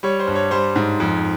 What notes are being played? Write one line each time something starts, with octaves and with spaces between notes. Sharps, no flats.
G3 C#5
C5
G2
C#5
G3 C5
G#2
F2